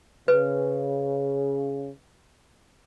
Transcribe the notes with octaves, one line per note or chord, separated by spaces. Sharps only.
C#3 B4